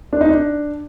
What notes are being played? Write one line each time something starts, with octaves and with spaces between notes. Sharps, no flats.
D4
D#4
D4